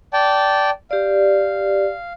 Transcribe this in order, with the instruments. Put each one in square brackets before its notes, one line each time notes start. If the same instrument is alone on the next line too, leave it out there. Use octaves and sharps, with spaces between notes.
[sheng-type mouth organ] D5 G5 A5
[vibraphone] G4 D5 [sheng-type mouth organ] F5